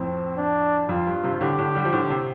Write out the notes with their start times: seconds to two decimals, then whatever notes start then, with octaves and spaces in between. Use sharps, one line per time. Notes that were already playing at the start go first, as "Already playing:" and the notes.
Already playing: F2 A2 C4
0.37 D4
0.89 F2 F4
1.07 G2
1.23 G2 C3
1.34 C3
1.41 A2 D3 G4
1.58 A2 D3
1.75 D3 G3
1.85 F3
1.93 A2 D3
2.10 C3